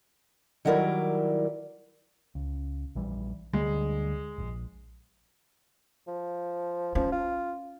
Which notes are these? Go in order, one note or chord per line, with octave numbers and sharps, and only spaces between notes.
D#3 F#3 G3 E4 A#4 D5
C#2
A#1 E3 G3
D2 D3 G3 G#3
D1 A#1
F3
F3 C#4
F4